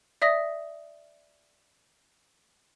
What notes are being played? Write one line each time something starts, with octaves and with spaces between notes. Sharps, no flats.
D5 E5 D#6 A#6